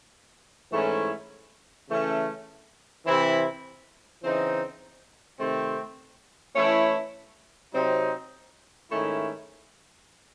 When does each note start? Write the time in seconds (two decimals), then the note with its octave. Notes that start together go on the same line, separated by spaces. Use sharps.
0.71 G#2 E3 A3 C#4 E4
1.88 C#3 E3 A3 C#4
3.05 C3 E3 C4 E4
4.22 C#3 E3 C4 D#4
5.39 C3 D#3 A3 C4
6.56 E3 A3 C#4 E4
7.73 C3 F#3 C4 D#4
8.90 G#2 D#3 A3 C#4 E4